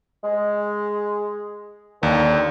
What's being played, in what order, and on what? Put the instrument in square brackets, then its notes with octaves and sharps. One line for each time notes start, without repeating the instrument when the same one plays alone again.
[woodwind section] G#3
[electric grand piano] D#2 [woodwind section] D3 D#3